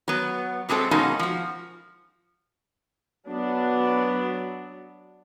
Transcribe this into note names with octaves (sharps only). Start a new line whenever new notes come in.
F#3 B3
C3 F#3 G#3 C4 A4
B2 G#3 A#3 C#4 D#4 F#4
F3 F#4
F#3 B3 D4